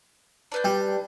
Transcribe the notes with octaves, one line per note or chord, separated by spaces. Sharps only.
D4 B4 G6
G3